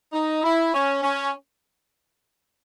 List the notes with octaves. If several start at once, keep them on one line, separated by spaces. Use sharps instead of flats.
D#4
E4
C#4
C#4